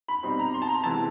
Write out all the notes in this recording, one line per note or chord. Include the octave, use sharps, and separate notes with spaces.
B5
B2 G3 C4 D#4 B5
A#5
C6
A5
A#5
C3 E3 G#3 B3 A5